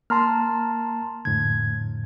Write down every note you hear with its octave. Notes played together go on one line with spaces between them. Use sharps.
A#3 A5 A#5 C6 F6
F2 A2 D3 G#6